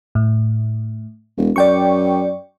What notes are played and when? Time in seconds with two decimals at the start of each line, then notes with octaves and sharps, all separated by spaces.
0.15 A2
1.37 E1
1.56 F#2 D5 G5 C#6